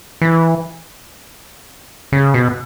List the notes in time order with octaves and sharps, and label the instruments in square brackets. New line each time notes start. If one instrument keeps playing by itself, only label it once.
[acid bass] E3
C#3
B2